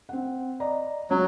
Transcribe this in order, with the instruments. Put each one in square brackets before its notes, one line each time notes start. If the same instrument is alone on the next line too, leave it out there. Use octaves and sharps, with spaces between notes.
[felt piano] C4 F#5
D5 D#5 A#5
[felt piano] C#2 [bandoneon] F#3